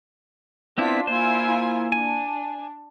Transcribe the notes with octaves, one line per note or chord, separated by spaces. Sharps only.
B3 C4 D4 E4 F4 B6
A#3 E4 F4 C5 G#5
D4 G#5